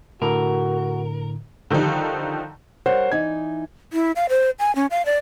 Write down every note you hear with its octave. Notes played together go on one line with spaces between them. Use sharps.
A2 D3 F#4 A#4
D3 D#3 F3 G3 D#4
G3 A#4 C5 C#5 F#5
E3 D#4 G#6
E4
F5
C5
G#5
C#4
F5
D5